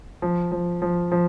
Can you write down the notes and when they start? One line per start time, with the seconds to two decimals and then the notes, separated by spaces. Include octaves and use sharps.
0.22 F3
0.52 F3
0.82 F3
1.12 F3